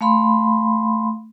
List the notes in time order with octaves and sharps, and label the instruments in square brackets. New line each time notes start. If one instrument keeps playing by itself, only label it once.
[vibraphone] A3 F5 B5 C6